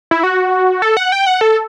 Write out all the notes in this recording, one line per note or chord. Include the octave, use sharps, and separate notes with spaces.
E4
F#4
A4
F#5
G5
F#5
A4